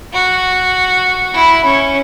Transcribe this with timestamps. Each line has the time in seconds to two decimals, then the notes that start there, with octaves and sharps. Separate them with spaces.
0.13 F#4
1.34 E4
1.65 C#4